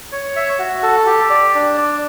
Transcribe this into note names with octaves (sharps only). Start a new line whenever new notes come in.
C#5
E5
F#4
A4
G4
D5
D4
D5